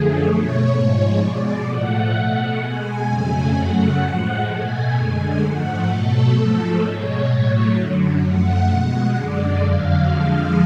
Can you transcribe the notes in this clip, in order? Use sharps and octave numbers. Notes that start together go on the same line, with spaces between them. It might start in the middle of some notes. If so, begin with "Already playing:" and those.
Already playing: F#2 D3 F3 A3 G#4
B2 A3 C#5
G#2 F3 G#3
B2 G#3 D5
A2 F3 A3 F#5
B2 A3
B2 G#3 G#5
F2 C#3 F#3 A3
F#2 C#3 F#3 A3 F#5
A2 F3 G#3
B2 A3 G#5
F#2 D3 G#3
G#2 F3 A3 F#5
B2 F#3 A3 A4
G#2 F3 A3
B2 G#3 C#5
A2 F#3 A3
F#2 D3 F#3
F#2 F3 A3 F#5
B2 G#3
F#2 D3 G#3 D5
F2 D3 F#3 F5
F2 D3 F3 G#3